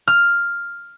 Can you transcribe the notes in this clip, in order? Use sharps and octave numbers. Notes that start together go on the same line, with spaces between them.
F6